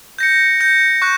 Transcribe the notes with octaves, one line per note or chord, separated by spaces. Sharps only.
G6 A#6 C#7
G6 A#6 C#7
C#6 F#6